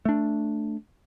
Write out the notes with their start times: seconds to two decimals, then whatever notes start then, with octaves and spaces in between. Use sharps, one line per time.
0.05 A3 D4